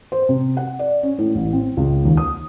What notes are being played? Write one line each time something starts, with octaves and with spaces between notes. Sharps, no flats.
C5
C3
F#5
D5
C#4
A2
A1
C4
C#2
D#2
D#6